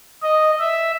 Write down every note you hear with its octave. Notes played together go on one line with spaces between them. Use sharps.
D#5
E5